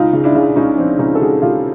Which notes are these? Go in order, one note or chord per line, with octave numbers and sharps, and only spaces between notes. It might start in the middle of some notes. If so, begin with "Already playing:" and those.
Already playing: C#2 D#4 F4
C#3
D4 E4
C#3
C#2 C#4 D#4
F3 C4 D4
C#2 C#4 D#4
A4
C#2 F#4 G#4
C#2 F4 G4